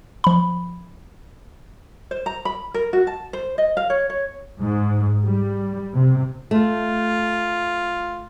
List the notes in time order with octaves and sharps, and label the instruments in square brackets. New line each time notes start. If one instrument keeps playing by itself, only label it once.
[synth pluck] F3 B5
[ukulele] C5
A#5
B5
A#4
F#4
A5
C5
D#5
F5
C#5
C#5
[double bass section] G#2
G3
C3
[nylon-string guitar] A3 [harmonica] F4